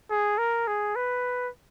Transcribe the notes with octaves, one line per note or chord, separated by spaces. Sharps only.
G#4
A#4
G#4
B4